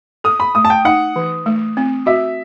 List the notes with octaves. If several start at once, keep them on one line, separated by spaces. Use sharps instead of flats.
A4 D#6
B5
A3 D#6
A5
G5
D#4 F#5
E3
A3
C4
F#4 E5